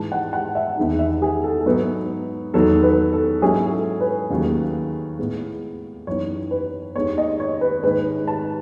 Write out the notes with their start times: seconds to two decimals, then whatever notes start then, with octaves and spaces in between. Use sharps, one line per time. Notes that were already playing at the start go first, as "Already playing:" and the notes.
Already playing: G#2 E3 G#3 A5
0.12 F#5
0.33 F#5
0.55 E5
0.77 E2 D#3 G#3 D#4
0.99 E5
1.22 G#4
1.44 A4
1.60 A4
1.66 G#2 F#3 B3 D#4 B4
2.54 E2 D#3 F#3 B3 D#4 A4
2.83 B4
3.13 A4
3.42 G#2 F#3 C#4 E4 G#4
3.72 A4
4.01 B4
4.30 D#2 C#3 F#3 A3
5.18 A2 G#3 B3
6.07 F#2 E3 B3 D#4 C#5
6.51 B4
6.95 D#2 D#3 G#3 B3 C#5
7.18 D#5
7.40 C#5
7.61 B4
7.83 G#2 D#3 G#3 B4
8.28 A5